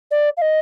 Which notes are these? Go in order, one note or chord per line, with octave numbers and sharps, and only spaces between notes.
D5
F5
D#5